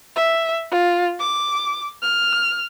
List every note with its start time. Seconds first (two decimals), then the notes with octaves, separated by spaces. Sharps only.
0.16 E5
0.71 F4
1.20 D6
2.02 F6